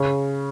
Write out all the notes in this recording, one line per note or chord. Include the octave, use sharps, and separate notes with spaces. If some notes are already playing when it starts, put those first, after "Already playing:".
Already playing: C#3